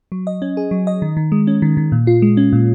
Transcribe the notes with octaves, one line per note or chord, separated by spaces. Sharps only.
F#3
D#5
C#4
G#4
F#3
D#5
D#3
D#3
G#3
C#4
D#3
D#3
A#2
F4
G#3
C#4
A#2